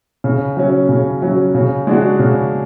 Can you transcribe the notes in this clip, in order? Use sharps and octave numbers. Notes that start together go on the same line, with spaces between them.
C#3
F#3 C#4
C#3
F#3 C#4
C#3
G#3 D4 F#4
C#3